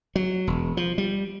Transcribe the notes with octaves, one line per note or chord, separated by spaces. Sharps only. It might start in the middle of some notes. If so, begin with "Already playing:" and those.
F#3
E1
F3
G3